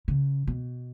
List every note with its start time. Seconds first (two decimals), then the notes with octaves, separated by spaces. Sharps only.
0.08 C#3
0.47 B2